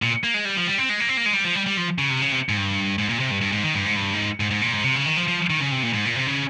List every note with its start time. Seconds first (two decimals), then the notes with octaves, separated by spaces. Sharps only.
0.02 A#2
0.24 A#3
0.34 G#3
0.45 G3
0.57 F3
0.67 G3
0.78 C4
0.89 G#3
1.00 A#3
1.09 C4
1.17 A#3
1.26 G#3
1.33 G3
1.45 F3
1.55 G3
1.66 G3
1.77 F3
1.99 C#3
2.10 C3
2.22 C#3
2.32 C3
2.49 G#2
2.57 G2
2.98 G#2
3.09 A#2
3.20 C3
3.31 G2
3.41 G2
3.52 G#2
3.64 D#3
3.74 G2
3.85 G#2
3.96 G2
4.13 G#2
4.40 G#2
4.51 G#2
4.62 A#2
4.73 G#2
4.84 C3
4.95 C#3
5.06 D#3
5.17 F3
5.28 F3
5.50 D#3
5.60 C#3
5.72 C3
5.83 A#2
5.93 G#2
6.05 A#2
6.16 C3
6.27 C#3